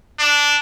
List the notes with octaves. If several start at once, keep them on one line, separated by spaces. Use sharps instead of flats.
D4